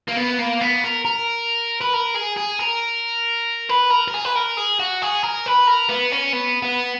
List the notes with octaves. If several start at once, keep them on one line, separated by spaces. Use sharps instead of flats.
A#3
B3
A#3
B3
A#4
A#4
B4
A#4
G#4
G#4
A#4
B4
A#4
A#4
G#4
B4
A#4
G#4
F#4
G#4
A#4
B4
A#4
B3
C#4
B3
B3